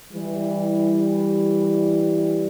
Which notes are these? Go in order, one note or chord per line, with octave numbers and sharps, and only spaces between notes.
E3 G3